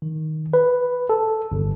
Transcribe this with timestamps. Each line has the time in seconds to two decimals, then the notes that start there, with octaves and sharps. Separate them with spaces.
0.02 D#3
0.53 B4
1.09 A4
1.52 G1